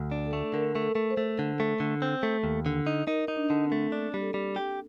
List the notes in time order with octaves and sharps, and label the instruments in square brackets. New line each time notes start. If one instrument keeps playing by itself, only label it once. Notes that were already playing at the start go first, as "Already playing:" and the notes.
Already playing: [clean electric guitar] D2
D4
[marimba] A4
[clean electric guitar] A3
[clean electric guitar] D3 [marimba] A#4
[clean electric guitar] A3
[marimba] A4
[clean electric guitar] A3
[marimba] C5
[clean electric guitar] A3
D3
A3
D3
C4
A3
D#2
D3
D#4
[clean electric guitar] D#4 [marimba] A#4
[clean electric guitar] D#4
[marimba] D4
[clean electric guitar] D3
[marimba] C4
[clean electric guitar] A3
[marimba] A#3 [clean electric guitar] D4
[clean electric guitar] G3
[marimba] A4
[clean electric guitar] G3
G4